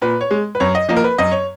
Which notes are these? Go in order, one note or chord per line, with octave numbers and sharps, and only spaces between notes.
A#2 B4
C#5
G#3
B4
F#2 C#5
D#5
F3 A#3 D#5
A#4
B4
F#2 D#5
C#5